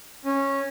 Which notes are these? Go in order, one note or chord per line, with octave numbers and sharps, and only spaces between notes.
C#4